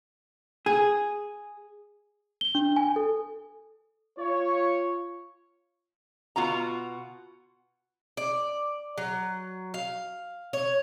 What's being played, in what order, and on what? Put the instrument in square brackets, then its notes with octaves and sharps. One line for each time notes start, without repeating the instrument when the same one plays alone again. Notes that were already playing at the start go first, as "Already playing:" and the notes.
[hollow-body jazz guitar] G#4
[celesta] G7
D4
G#5
A4
[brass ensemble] F4 C#5
[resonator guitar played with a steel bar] B2 F4 F#4 A#5
[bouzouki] D5
F#3
F5
C#5